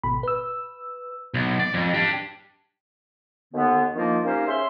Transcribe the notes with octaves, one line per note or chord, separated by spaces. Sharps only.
G#1 B2 B5
B4 E6
B1
D5
F2
D4 G4
D#2 D3 B3
D#3 F3 A#3 D4 F4
A#3 C#4 D#4 G4 C5
C#3 C#4 E5 C6